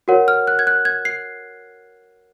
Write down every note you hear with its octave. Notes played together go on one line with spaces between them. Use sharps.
F#4 A#4 C#5 F#5
F6
F#6
G#6
F#6
G#6
C7